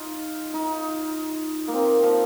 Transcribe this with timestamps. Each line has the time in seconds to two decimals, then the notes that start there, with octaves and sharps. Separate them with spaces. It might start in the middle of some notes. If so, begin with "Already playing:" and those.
Already playing: D#4 F4
0.54 D#4
1.68 A#3
1.73 C4
2.03 F3